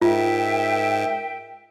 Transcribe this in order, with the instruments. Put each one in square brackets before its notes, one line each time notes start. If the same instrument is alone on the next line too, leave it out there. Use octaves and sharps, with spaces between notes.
[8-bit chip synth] G#2 [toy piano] F4 [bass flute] A#4 [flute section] E5 G5